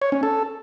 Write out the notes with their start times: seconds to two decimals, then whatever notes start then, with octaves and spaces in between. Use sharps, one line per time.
0.02 C#5
0.12 C#4
0.23 A4